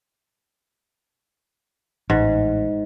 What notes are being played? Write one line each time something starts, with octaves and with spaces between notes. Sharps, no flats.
A1 G#2